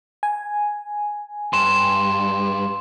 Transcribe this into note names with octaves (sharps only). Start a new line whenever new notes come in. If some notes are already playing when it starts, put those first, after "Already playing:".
G#5
G2 C6 E7